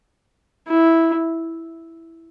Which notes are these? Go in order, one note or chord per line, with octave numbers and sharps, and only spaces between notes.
E4